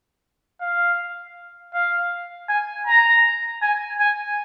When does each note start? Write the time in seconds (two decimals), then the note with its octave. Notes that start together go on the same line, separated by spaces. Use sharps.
0.61 F5
1.74 F5
2.49 G#5
2.87 A#5
3.62 G#5
4.00 G#5